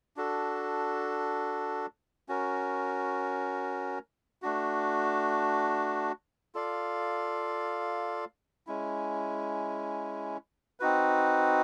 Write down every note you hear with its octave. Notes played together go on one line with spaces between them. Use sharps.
D4 F#4 A4
C#4 F#4 A#4
A3 D4 F#4
F4 A4 D5 F5
G#3 C#4 E4
C4 D#4 F#4 B4